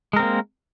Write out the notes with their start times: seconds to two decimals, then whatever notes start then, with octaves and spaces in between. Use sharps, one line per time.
0.13 G#3
0.16 A#4
0.19 C4
0.22 A#3